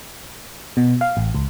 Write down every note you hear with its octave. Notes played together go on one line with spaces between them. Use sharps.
B2
F5
A1
C#2